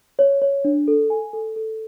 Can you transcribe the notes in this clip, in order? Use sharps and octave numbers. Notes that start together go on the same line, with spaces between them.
C#5
C#5
D4
A4
G#5
A4
A4